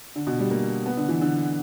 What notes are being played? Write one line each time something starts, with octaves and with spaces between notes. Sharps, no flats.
D3
B2
G3
A#3
B3
D3
E3
D3